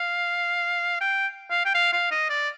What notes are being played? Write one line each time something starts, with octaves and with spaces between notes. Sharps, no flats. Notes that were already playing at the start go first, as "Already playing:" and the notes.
Already playing: F5
G5
F5
G5
F5
F5
D#5
D5